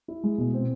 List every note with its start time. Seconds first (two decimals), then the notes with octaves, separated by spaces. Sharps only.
0.08 E4
0.23 G#3
0.38 B2
0.54 C4